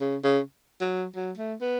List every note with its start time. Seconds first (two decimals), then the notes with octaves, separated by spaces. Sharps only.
0.01 C#3
0.24 C#3
0.81 F#3
1.16 F#3
1.38 A3
1.61 B3